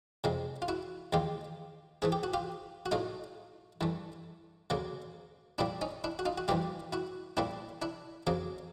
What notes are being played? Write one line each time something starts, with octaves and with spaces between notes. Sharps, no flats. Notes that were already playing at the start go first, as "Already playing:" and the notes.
F2 C3 F3 G#3
F4
E4 F#4
D#2 D#3 G#3 F4 G4
G#2 E3 A3 G#4
G4
F#4
F4 G4
F#4
A2 F#3 A3 D#4 F4
G2 E3 A3
D2 C#3 F#3 A#3
A#2 G3 A#3 D4 E4
C#4 D#4
D4 E4
F#4
D#4 F4
F#4
G2 E3 G3 A#3 F4 G4
E4 F#4
A#2 G3 A#3 D4 E4
D4 E4
F2 C#3 F#3 A#3